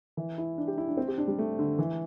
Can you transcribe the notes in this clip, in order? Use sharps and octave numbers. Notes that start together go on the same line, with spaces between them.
E3
E4
D4
G4
E4
D4
C4
G4
D4
G3
A3
D3
E3